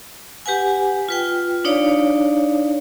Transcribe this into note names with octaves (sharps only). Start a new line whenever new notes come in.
G4 B4 F#5 G#5
F4 B4 G5
D4 D#4 C#5 D5 F5